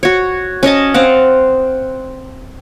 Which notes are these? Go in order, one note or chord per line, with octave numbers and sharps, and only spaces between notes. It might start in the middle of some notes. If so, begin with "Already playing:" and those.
F#4 C#5
C#4 C#5 D#5 A5
C4 F5 F#5